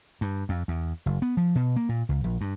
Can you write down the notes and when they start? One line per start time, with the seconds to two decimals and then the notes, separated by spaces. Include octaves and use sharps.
0.21 G2
0.49 F2
0.68 E2
1.06 F#1
1.22 B3
1.37 F3
1.55 B2
1.76 A#3
1.89 A#2
2.09 C#2
2.24 A#1
2.41 G2